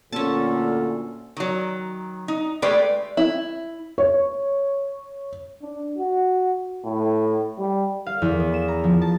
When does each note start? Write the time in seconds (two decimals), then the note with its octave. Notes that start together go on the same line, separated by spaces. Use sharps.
0.12 D2 A#2 C#4 F4 A4 A5
1.37 D#3 F#3
2.28 D#4
2.62 G#3 A3 G4 B4 D5
3.17 E4
3.98 C#5
5.62 D4
5.98 F#4
6.85 A2
7.58 G3
8.06 F5
8.22 E2
8.40 B3
8.54 E7
8.68 A#5
8.84 F3
9.02 A5